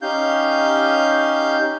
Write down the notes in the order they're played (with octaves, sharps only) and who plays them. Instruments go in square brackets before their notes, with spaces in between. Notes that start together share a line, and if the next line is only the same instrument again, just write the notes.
[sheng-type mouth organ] C#4 D#4 G4 F5 G6